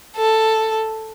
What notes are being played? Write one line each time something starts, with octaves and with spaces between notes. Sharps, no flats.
A4